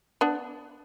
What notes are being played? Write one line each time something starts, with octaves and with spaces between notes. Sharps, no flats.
B3 D4